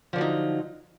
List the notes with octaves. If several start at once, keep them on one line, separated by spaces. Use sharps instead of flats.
D3 F3 F#3 D#4